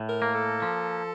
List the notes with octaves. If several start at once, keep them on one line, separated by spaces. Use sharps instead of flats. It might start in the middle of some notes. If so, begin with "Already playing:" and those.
Already playing: A2
A#4
A#3
A4
F3